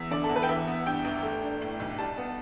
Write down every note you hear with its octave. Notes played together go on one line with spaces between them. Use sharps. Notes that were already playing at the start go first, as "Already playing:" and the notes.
Already playing: E2 B3 E5
D3 D5
A4
E2
B4
G5
E3 E5
B3
G2 G5
G1
A3
D4
A2
B1
G3 A5
B3